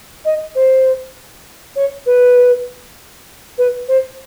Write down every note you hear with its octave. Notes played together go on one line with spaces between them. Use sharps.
D#5
C5
C#5
B4
B4
C5